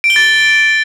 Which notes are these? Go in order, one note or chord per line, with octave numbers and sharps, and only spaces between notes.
D7
G7
A6